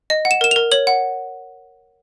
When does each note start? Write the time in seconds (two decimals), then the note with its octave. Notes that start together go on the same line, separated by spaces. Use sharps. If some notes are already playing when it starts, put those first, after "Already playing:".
0.10 D#5
0.25 F#5
0.31 E7
0.41 A#4 E7
0.51 A#4 F7
0.72 C#5 F#7
0.87 F#5